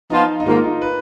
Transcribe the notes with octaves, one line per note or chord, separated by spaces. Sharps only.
F3 B3 D#4 F4
D#4
G#2 D#3 A#3 F4
D#4
B4